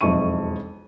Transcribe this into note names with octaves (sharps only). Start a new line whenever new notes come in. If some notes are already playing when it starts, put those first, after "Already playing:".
E1 B1 F2 E5 C#6 D#7